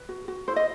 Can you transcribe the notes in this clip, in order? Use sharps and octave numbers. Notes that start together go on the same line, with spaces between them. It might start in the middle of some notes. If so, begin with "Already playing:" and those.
Already playing: B4
F#4
F#4
E4 C5
D#5